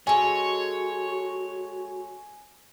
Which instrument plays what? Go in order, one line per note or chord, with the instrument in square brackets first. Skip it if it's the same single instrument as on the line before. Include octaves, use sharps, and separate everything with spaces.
[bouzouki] G#3 A4 [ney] F#4 [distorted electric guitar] C#5 [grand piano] G#5